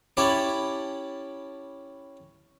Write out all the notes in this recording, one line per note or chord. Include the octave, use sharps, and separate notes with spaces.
C#4 E4 G4 A5 B5